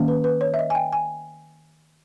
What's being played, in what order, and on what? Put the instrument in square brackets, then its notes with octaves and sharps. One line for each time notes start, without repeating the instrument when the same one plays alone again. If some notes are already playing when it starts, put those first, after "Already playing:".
Already playing: [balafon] D#3 A#3 C#4
B4
B4
C#5
E5
D#5
G#5
G5
G#5